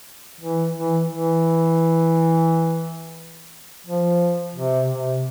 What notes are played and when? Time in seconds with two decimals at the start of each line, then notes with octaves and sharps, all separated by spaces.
0.41 E3
0.75 E3
1.10 E3
3.87 F3
4.56 C3
4.90 C3